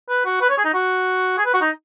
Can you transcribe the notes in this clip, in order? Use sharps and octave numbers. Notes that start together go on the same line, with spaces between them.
B4
F#4
B4
C#5
G#4
D#4
F#4
G#4
B4
F#4
D#4